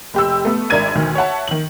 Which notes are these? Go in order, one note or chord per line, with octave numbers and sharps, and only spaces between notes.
F1 G4 E6
A3 B3
G#1 D4 A#4 E5 G#6 D#7
D2 B2 D#3
C#5 E5 F#5 A5
D#3 F#7